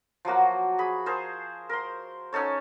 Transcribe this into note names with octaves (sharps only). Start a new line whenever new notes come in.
F3 F#3 A#3 F#4
G#4 B5
G#4 A#4 C5 A5
A#4 C6
C#4 D#4 A4 C#5